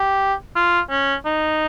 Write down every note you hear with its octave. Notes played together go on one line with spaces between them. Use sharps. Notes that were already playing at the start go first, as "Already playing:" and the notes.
Already playing: G4
F4
C#4
D#4